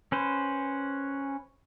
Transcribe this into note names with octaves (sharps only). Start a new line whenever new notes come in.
C#4 B4 C5